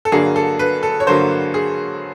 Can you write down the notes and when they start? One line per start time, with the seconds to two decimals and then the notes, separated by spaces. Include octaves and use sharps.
0.05 A4
0.12 G2 D3 F#3 A#3 G#4
0.36 A4
0.59 B4
0.83 A4
1.00 C#5
1.07 G2 D3 F#3 A#3 C5
1.54 G#4